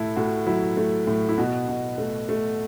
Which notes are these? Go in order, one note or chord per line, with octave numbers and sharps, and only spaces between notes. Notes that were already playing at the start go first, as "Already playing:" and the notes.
Already playing: A2 A3 E4 A4
A2 F#4
F#3 E4
A3
A2
E4
B2 F#4
B2
A3
A3